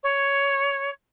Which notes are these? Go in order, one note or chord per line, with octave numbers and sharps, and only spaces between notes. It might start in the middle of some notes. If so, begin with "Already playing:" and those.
C#5